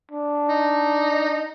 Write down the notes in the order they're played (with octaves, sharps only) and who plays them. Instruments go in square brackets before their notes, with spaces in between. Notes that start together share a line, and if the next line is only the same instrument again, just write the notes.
[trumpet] D4
[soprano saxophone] D#4